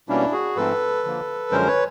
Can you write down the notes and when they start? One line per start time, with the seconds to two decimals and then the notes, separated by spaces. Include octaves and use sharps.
0.09 B2 G3 A#3 C#4 D4 E4
0.33 F#4 G#4
0.56 G#2 F3 A3 C4 A4 B4
1.04 D3 F3 A#3
1.51 F#2 D3 F3 G#3 C#4 A#4 C5
1.67 B4 C#5